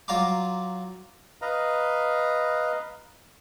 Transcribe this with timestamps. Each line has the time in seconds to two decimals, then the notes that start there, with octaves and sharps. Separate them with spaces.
0.08 F#3 F4 A#5 C6 D6
1.42 B4 D#5 F5 A#5